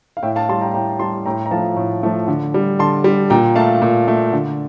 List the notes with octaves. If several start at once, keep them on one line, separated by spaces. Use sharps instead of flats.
F5
A2 E5 G5
F5 A5
G3 A5 C6
G5 A#5
A2 G5 A#5
G3 A5 C6
A2 G5 A#5
A#5
F3 A3 F5 A5
A2
F3 A3
D3
G3
D3 A5 C6
G3
A#2 G5 A#5
A3 F5 A5
A#2
A3
D3